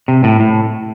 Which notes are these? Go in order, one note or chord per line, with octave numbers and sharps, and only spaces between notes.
C3
A2
A2